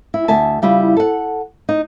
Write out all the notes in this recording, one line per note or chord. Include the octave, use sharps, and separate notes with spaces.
E4
D2 E5 G#5 A5
C#3 G3 E4 F4
A4 F#5
D#4